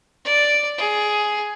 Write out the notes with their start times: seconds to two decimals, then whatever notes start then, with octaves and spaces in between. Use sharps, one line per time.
0.25 D5
0.78 G#4